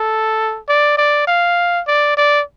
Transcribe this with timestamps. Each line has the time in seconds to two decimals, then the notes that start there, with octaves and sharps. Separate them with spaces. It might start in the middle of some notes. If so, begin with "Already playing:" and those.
Already playing: A4
0.69 D5
0.98 D5
1.27 F5
1.87 D5
2.17 D5